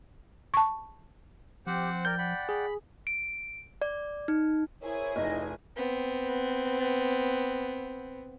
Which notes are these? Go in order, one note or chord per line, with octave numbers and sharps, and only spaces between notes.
A5 C#6
F3 C4 G4 C5 F#5
A#4 D5 G5 G6
D5 F#5 G5 B5
G#4 B5
D7
D5
D#4
E4 G#4 A#4 C5 C#5 G#5
F1 C#3 E3 D#4 D#5
B3 C4